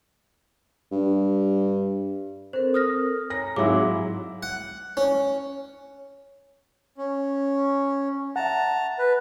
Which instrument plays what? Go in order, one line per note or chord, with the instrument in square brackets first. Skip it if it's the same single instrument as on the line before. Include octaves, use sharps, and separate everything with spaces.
[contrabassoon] G2
[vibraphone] C4 A4 A#4 [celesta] C5
[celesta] D#6 F6 A#6
[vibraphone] C#5 G#5 A#5 [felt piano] A#6
[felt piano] G#2 F#3 E4 [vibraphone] C4 F5 G#5 [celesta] E5 D6
[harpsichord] F#5
C#4
[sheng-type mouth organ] C#4
[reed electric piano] E5 F#5 [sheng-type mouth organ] A5 A#5
[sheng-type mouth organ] B4